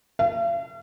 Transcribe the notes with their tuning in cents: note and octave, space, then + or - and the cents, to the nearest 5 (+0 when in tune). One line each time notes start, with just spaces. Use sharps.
F5 -45